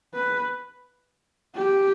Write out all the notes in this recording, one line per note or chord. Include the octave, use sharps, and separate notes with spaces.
B4
G4